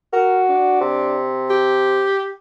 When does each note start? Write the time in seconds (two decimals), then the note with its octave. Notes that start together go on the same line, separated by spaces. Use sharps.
0.13 F#4 A#4
0.49 D4
0.81 C3
1.50 G4